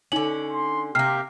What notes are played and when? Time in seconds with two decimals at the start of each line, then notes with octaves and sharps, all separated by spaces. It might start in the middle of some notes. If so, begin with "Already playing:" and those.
0.12 D3 C#4 D#4 F#7
0.52 C6
0.95 C3 A#3 G4 F6 C7